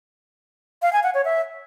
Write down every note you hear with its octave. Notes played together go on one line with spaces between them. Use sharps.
F5
G#5
F#5
C#5
E5